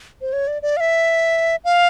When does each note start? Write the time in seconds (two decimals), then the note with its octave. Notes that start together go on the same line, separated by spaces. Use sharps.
0.21 C5
0.33 C#5
0.47 D5
0.62 D5
0.77 F5
0.80 E5
1.64 F5